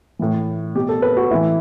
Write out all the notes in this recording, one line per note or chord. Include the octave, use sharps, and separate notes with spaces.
A2 E3
B2 G4
A4
B4
F#4
A2 E3 E4